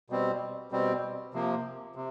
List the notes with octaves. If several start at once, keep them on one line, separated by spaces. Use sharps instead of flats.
B2 G3 C4
B2 G3 C4
C3 F3 A#3
C3